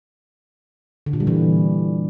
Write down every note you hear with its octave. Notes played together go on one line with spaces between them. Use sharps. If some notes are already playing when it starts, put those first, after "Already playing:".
D3
A#2
G3
E3